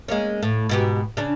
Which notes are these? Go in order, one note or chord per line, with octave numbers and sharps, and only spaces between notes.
G#3 A#3 C#4
A2
G#2 B2 G4
C#3 D4